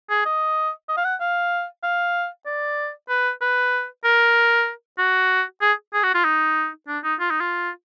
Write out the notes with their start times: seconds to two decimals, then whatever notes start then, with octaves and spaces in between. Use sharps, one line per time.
0.10 G#4
0.26 D#5
0.89 D#5
0.97 F5
1.04 F#5
1.20 F5
1.83 F5
2.46 D5
3.09 B4
3.41 B4
4.04 A#4
4.99 F#4
5.61 G#4
5.93 G#4
6.03 F#4
6.14 F4
6.24 D#4
6.88 D4
7.04 D#4
7.20 F4
7.30 D#4
7.40 F4